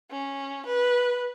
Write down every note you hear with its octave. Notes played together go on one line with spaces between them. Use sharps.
C#4
B4